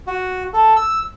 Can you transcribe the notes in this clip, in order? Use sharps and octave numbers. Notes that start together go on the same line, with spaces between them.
F#4
A4
E6